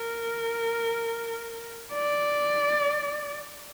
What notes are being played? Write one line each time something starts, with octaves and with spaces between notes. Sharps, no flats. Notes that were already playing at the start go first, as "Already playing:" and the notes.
Already playing: A#4
D5